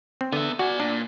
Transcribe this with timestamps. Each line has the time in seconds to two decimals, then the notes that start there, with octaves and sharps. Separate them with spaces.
0.21 C4
0.33 D3 B3 E5
0.59 F#4 D5 G#5
0.80 A#2 D4